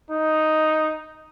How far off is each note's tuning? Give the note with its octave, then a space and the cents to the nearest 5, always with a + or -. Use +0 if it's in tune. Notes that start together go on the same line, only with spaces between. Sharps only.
D#4 +0